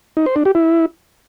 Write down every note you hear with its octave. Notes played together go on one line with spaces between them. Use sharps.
D#4
C5
D4
G4
E4